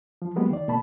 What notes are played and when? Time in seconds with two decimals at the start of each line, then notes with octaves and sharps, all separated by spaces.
0.22 F3
0.36 F#3 G#3 A#3 B3 G4
0.51 D#3 D5
0.68 B2 A#3 A5 B5